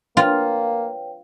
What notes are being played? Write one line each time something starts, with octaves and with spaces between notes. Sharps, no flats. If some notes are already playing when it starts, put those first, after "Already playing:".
A#3 F4 B4 C#5 G5